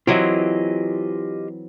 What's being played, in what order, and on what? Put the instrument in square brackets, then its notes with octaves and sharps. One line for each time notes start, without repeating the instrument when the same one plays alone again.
[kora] E3 F#3 C4 [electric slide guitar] F4 G4 D#5